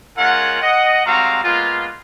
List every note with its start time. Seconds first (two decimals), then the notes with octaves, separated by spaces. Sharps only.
0.18 G#3 C#4 F4 A#4 F#5
0.62 D#5 F#5
1.06 G3 G#3 C4 F#4 F5 A#5
1.44 G#3 A#3 B3 F4